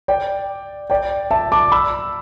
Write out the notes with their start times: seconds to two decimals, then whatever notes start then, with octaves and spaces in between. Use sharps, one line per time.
0.08 D5 G5
0.90 D5 G5
1.31 E5 A5
1.52 A5 D6
1.72 B5 E6